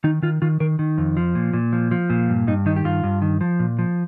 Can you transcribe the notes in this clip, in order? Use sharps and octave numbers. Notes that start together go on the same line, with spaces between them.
D#3 D#4
D#3 F4
D#3 F4
D#3 A#4
D#3
F2
F3
A#2
A#2
F3
F3
A#2
G2
G2 D#4
D#3 D#4
G4
G2 F4
G2
D#3
F3
A#2
F3